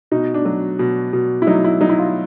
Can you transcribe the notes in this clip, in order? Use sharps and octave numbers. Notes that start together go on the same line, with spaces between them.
B2 D#4
D4
F#3
B2
B2
E4
F#3 D#4
E4
F#3 D#4
E4
F4